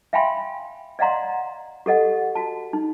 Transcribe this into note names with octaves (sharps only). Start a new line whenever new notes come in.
E5 F5 G5 G#5 B5 C6
D5 D#5 F5 F#5 A#5 C6
G4 A4 D#5 F#5
F#4 A5
D#4